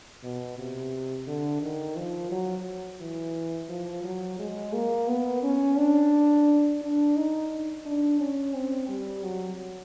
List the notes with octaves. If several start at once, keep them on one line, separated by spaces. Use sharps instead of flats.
B2
C3
D3
D#3
F3
F#3
E3
F3
F#3
G#3
A#3
B3
C#4
D4
D4
D#4
D4
C#4
C4
G3
F#3